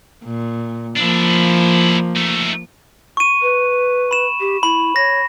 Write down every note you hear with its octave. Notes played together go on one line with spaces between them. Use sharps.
A#2
F3 A#3 D4 E4
A3 D#4
C#6 D#7
B4
B5 E7
G4
E4 B5
C#5 A#6